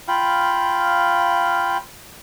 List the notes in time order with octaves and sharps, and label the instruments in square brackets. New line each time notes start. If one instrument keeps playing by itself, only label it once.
[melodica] F4 F5 G5 B5